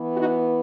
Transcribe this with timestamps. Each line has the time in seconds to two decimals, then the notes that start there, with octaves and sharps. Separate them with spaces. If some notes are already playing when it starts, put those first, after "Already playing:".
Already playing: E3 B3
0.17 D#4 F#4